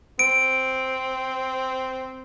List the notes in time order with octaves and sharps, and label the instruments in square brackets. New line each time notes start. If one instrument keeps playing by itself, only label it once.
[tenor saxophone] C4 [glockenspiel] D7